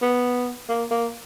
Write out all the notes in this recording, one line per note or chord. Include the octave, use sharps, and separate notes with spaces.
B3
A#3
A#3